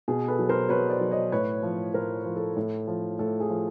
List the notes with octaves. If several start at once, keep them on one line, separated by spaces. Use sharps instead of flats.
B2 G#4
A4 B4
F#3
A#4 C5
B2 B4 C#5
C5 D5
F#3
C#5 D#5
A2 B4 C#5
F3
A2 A#4 C5
F3
A4
A2
F3
A2 A4
G#4
F3